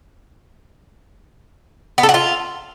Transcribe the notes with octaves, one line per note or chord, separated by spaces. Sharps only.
B3
A4
F#4
F4